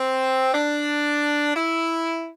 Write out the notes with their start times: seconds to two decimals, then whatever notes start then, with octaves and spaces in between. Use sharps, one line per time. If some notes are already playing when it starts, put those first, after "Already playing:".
Already playing: C4
0.54 D4
1.56 E4